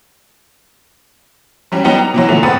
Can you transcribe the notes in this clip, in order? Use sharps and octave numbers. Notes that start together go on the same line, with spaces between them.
F#3 G3 C#4
F#3 G3 B3 D#4 G4
A#5
B2 E3 F#3
A#2 D3 F#3 A3
G#2 C4 B4 F#5 D#6 A6